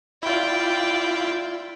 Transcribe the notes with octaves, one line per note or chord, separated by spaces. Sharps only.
E4 F4 D5 G5